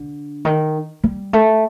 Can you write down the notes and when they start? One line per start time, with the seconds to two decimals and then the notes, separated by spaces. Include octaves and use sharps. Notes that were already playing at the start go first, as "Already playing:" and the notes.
Already playing: D3
0.45 D#3
1.04 G3
1.33 A3